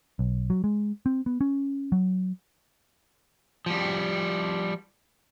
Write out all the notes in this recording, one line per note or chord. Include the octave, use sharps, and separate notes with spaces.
B1
F#3
G#3
C4
B3
C#4
F#3
F3 G3